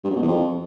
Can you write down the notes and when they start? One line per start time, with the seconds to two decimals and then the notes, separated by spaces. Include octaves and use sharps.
0.04 G2
0.10 F#2
0.16 B2
0.22 E2
0.28 F2